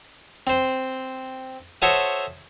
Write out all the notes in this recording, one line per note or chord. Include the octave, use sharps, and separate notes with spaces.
C4 C5
F#4 A4 C5 C#5 E5 D#6